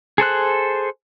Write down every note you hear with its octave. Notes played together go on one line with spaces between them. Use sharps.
G#4 A4 C5 F#6